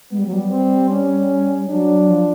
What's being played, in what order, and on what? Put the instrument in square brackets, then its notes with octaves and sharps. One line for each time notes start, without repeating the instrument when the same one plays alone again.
[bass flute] G#3 [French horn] B3
[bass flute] G3
F#3
G3
[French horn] C4
C#4
[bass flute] F#3 [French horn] D4
[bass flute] F3